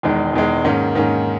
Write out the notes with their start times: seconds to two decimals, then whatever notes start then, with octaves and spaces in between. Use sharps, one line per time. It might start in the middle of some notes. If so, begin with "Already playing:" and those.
0.03 E1 E2 D#3 G#3
0.33 E1 E2 D#3 G#3
0.65 G#2 D#3 A#3 C#4
0.95 G#2 D#3 A#3 C#4